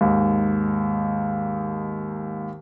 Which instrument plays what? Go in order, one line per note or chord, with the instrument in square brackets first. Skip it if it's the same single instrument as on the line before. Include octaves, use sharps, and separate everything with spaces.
[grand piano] D#2 G#2